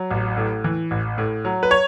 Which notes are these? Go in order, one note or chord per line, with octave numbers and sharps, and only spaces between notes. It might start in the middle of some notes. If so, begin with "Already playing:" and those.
Already playing: F#3
A1
A2
E3
A1
A2
F#3
B4
C#5